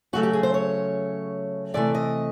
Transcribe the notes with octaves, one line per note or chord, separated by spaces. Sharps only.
C#3 F#3 A3 F#4
G4
G#4
C5
C#5
C3 E3 A3 D5
D#5